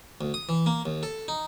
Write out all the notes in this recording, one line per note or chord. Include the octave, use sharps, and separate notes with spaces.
D2
D#6
E3
A#3
D#2
A4
D#4